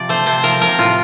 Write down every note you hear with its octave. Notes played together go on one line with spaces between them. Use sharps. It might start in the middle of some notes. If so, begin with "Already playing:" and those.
Already playing: C3 F3 D5
A3 C5
C3 C5
F3 A#4
C3 A#4
A2 F4